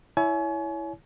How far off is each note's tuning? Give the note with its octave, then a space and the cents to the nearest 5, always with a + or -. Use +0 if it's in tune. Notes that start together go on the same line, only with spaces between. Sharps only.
E4 +0 C#5 +20 G#5 +35